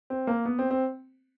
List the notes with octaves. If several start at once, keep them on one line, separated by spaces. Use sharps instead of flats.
C4
A#3
B3
C4
C4